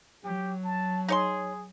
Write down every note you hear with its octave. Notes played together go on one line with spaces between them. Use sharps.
F#3 G4
A5
D#4 G#4 C#5 C6